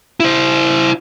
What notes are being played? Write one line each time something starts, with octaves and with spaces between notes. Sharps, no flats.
E4 C5